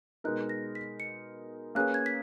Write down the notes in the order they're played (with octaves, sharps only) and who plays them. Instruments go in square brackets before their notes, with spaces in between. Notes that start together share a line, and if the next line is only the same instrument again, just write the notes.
[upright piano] B2 G#3 B3 D#4 A#4 [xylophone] F#6
[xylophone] A#6
B6
C#7
[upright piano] A#3 C#4 G#4 B4 [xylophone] F#6
[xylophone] G#6
B6